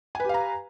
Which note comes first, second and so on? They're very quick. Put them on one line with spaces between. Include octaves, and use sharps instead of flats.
G#5 B4 G4 F5 A#5